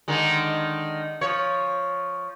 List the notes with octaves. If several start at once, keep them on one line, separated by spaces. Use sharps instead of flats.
D3 D#3 G#3
F3 C#5